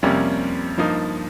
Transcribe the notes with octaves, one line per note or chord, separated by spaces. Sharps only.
F2 C3 G3 A#3 C#4
G2 F3 A#3 D#4